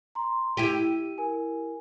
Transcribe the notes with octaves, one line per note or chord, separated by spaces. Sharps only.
A#5 C6
E4 G4 D#7
A#4 G#5